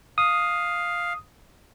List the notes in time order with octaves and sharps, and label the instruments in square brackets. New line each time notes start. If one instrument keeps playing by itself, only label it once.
[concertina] F5 [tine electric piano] D#6